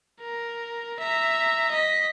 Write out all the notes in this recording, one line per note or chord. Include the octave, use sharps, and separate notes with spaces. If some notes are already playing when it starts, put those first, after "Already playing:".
A#4
E5 A#5
D#5 B6